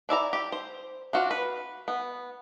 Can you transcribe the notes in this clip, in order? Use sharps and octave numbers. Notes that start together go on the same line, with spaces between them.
D4 E4 D5 A#5
G4
C5
D4 F4 F#4
B4
B3